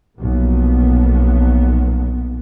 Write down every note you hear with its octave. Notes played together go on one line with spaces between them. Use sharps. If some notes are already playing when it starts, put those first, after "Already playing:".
B1 F2 A#2 B3